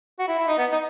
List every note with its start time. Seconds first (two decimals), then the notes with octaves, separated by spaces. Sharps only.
0.19 F#4
0.28 E4
0.39 E4
0.47 D#4
0.58 B3
0.72 D#4